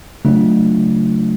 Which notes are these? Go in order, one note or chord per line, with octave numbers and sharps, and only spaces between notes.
C#3 F#3 A3 D4 F4